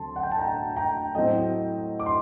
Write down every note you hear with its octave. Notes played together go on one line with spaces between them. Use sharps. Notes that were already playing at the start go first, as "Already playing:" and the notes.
Already playing: D2 D3 F#3 C4 A5 C6
F#5
G5
A5
G5 A#5
G5 A#5
A2 F#3 C4 D#5 G5
D6
C6